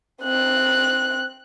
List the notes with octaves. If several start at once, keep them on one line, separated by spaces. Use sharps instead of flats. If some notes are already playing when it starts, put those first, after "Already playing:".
C4 F#6